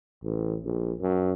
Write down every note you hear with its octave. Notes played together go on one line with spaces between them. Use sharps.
A1
A#1
F#2